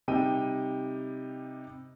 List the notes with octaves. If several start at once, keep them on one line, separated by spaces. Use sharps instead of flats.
C3 G3 D#4 G5 D#7